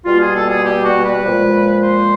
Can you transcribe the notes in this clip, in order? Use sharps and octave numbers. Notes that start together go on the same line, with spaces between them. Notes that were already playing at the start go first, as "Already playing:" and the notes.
B2 G3 A#3 F4
G#4
A4
G#4
G4
F#4
B4
A#2 F3 G#3
C5